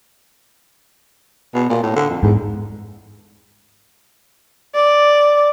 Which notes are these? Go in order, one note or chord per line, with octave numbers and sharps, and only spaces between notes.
B2
A#2
A2
D3
F2
E2 G#2
D5